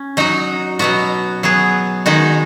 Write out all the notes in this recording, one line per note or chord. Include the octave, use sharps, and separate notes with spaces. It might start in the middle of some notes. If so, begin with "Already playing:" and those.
Already playing: C#4
F#3 D#4 F#4
B2 F#3 B3 F#4
F#3 B3 G#4
D#3 G#3 D#4 F#4